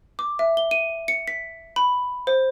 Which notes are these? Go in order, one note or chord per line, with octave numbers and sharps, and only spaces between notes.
D6
E5
G7
D#7
C#7
B6
B5
C5